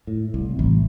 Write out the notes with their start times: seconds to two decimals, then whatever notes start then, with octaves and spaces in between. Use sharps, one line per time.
0.07 A2
0.34 C2
0.59 A1